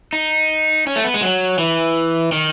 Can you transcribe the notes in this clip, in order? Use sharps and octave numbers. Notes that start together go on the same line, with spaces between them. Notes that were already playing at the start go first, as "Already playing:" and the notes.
D#4
C#4
A3
B3
G#3
F#3
E3
D#3